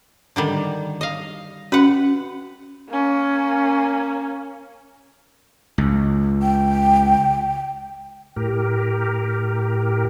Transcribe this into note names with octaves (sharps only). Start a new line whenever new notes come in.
D3 D#3 G3
D#5 F5
C#4 F#4 B4 F#5
A#3 C#4
C#2
G5
A2 G4 A#4